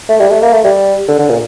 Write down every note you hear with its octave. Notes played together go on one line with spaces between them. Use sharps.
A3
G3
A3
A#3
A3
G3
D3
D3
A#2